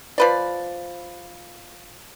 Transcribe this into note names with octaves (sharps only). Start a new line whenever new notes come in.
F3 B4 D5